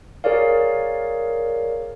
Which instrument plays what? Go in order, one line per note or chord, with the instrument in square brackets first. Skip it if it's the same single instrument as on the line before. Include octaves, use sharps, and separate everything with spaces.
[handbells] G#4 A#4 C#5 D5 F5